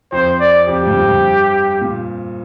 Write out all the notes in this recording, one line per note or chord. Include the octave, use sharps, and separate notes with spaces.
F2 C5
D5
F2 G4
G2
F2
G2
A#2